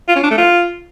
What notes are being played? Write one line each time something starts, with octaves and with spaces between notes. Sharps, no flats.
F4
C#4
D4
A3
F4